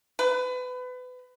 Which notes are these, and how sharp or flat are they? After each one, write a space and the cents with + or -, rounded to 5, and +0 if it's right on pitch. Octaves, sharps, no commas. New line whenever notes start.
B4 +30